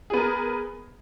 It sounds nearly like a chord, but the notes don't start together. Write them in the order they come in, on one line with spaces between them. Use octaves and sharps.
G#4 B3 A#4